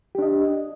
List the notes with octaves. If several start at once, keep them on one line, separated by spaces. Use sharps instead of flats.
D4 G4 D#5